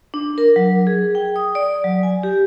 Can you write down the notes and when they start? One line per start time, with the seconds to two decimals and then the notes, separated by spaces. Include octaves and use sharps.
0.14 D4
0.38 A#4
0.56 F#3
0.87 G#4
1.15 G5
1.36 D#6
1.55 D5
1.84 F#3
2.03 G#5
2.23 G4